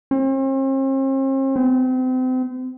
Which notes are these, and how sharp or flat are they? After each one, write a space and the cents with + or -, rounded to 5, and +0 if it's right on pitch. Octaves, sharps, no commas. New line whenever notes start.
C4 +45
C4 -35